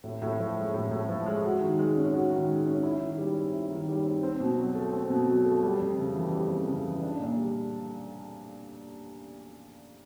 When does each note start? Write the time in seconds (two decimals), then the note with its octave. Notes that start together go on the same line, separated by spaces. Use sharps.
0.04 A2
0.22 A2
0.39 F3
0.57 G#3
0.74 A2
0.91 A2
1.09 F3
1.26 G#3
1.43 F#4
1.61 D#3
1.79 G#3
1.96 C#4
2.14 F#4
2.31 D#3
2.49 G#3
2.66 C#4
2.83 E4
3.01 D#3
3.18 G3
3.35 C4
3.53 E4
3.70 D#3
3.88 G3
4.05 C4
4.23 C4
4.40 B2
4.58 F#3
4.75 A3
4.93 C4
5.10 B2
5.28 F#3
5.45 A3
5.63 G3
5.80 F2
5.97 C#3
6.15 E3
6.32 G3
6.50 F2
6.67 C#3
6.85 E3
7.02 D4
7.20 A#2
7.37 G3